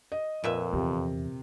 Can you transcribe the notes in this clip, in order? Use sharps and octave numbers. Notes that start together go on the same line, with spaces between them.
D#5
F2 A#2 B4 E5
E2 C3